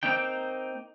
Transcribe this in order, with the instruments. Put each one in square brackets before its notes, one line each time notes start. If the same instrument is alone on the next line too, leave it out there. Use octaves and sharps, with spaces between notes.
[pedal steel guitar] A#3 C4 D#4 G5